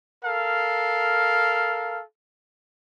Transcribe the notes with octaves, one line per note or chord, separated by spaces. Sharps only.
A4 A#4 F5